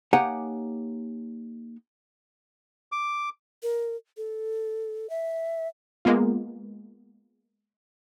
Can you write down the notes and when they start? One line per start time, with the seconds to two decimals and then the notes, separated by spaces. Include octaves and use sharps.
0.13 A#3 D#4 G4 C#5 F#5 G#5
2.92 D6
3.63 A#4
4.17 A4
5.10 E5
6.05 G#3 A#3 B3 F4